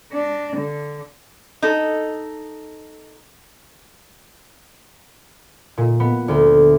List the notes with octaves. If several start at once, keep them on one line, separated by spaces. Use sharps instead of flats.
D4
D3
D#4 A4
A#2
B3
D2